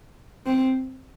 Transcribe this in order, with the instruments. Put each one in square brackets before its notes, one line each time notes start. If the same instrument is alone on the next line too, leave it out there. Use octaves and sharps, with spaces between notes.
[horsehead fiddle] C4